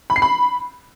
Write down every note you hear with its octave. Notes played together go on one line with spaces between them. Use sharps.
B5
C7
B5